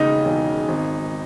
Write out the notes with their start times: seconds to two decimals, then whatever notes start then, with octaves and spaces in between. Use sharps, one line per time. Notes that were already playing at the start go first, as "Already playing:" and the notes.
Already playing: E1 D#2 C#3 D#4
0.25 E1
0.68 G#1